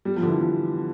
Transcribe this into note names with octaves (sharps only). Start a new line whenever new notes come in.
G3
F3
D3
E3
F3